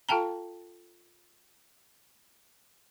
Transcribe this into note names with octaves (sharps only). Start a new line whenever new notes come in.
F4 A4 F5 G5 A5 A#5